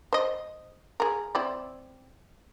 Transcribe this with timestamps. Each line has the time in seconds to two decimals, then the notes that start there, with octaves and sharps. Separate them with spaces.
0.13 C5 D#5
1.00 G#4 A#4
1.35 C4 E4 D5